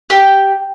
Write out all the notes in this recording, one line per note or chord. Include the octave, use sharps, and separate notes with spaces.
G4